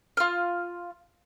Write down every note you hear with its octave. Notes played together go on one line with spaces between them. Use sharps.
F4 F6